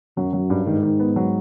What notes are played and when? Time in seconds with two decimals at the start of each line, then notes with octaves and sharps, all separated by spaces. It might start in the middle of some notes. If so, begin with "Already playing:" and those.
0.17 F#2 F#3
0.33 F#3
0.50 G2
0.66 G#2 D#3
0.83 D#3
1.00 B3
1.16 F#3